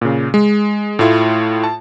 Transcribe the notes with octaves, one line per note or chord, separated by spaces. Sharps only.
A#2 C#3
G#3
A2 A3 E4 F4
A5